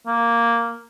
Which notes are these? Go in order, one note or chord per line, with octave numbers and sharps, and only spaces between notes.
A#3